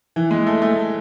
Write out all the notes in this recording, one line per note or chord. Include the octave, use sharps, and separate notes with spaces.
E3
G#3
A3
A3